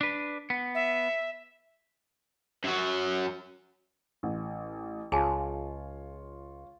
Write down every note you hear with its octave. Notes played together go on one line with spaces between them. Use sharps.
D4 B4
B3
E5
F#2 F#3
A1
C#2 F4 G#4 C#5 G#5 A5